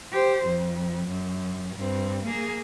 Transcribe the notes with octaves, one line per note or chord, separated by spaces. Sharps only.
G4 C5
F2
F#2
G2 C4
A#3 G#4